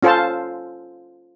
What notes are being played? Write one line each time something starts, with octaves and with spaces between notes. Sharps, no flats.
C#4 F4 A4 C5 F5 A5